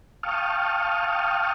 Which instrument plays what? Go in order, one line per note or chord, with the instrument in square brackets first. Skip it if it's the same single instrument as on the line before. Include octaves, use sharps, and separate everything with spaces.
[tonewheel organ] F5 G5 A5 C#6 D#6 F6